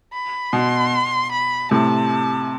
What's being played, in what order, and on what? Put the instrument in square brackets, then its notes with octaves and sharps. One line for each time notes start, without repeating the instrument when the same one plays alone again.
[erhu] B5
[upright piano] B2 [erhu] C6
[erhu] B5
[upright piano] A2 C3 [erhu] A5